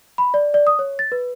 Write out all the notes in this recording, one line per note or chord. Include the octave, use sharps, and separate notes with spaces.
B5
D5
D5
D#6
C#5
A6
B4